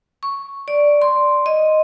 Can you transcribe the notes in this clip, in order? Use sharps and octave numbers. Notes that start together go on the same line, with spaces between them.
C#6
D5
C6
D#5